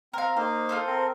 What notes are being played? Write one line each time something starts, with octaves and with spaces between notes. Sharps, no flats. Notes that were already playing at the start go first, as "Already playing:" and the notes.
C4 A#4 F5
A#3 D#4 C5 F5
F4 A4 C5
C4 A#4